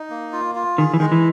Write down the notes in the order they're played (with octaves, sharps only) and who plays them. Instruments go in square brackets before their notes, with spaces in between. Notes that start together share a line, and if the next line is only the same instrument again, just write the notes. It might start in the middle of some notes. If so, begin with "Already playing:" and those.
Already playing: [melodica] D#4
A#3
F4
F4
[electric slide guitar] D#3 [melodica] G#4
[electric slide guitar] E3
[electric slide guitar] D#3 [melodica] G#3
[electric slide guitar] E3